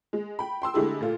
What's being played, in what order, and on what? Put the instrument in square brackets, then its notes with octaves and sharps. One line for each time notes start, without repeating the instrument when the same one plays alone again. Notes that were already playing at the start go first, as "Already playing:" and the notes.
[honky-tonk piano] G#3
G5 B5
G5 C6 E6
D3 G#3 A3 E4 G4 G#4
A#2 A3 F4